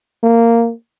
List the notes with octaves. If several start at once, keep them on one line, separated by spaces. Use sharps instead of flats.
A#3